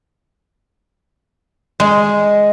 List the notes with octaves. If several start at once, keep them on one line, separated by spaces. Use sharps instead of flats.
G#3